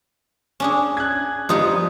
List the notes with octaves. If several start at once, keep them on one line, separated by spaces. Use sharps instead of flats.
C#4 D4 G#4
F#6 G#6
F3 G3 B3 D#4 F4 D#5